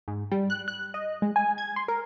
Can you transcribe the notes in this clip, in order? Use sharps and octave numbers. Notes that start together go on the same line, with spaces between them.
G#2
G3
F#6
F#6
D#5
G#3
G#5
G#6
C6
A#4